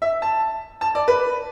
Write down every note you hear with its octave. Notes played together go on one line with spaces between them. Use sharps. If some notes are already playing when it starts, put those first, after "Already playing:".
E5
A5
A5
D5
B4